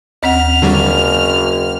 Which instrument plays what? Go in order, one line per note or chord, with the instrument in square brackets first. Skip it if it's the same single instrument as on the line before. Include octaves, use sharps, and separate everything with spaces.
[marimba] D#2 C4 F#5 [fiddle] F6
[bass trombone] F#1 [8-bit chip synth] D3 F#3 G3